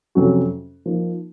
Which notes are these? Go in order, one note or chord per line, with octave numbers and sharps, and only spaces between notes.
F2 C3 F#3 C#4 F#4
F3 A#3 D#4